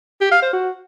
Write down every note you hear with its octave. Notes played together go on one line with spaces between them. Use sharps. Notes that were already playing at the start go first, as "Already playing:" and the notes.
G4
F5
C5
F#4